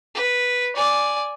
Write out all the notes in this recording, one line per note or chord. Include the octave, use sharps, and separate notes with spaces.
B4
D5 G#5